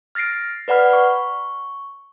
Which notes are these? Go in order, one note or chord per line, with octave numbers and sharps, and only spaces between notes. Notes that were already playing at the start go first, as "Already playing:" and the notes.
F6 A6 A#6 C7 D7
B4 D5 F#5 B5 F6
C#6